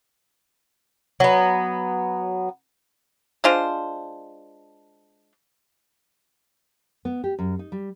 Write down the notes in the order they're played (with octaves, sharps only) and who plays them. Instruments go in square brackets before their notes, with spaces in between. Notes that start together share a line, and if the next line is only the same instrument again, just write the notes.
[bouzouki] F#3 B3
[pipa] G#3 D4 F4 C5
[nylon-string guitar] B3
G4
F#2
D#4
G3